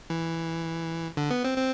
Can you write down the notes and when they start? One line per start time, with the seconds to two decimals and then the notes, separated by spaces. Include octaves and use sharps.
0.10 E3
1.17 D3
1.30 B3
1.44 C4
1.58 C4